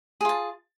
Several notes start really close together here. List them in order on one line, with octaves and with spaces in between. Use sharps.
G#4 F4 A5